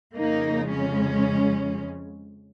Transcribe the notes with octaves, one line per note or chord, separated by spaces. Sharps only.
F2 C#3 A#3 D#4
G#3 C#4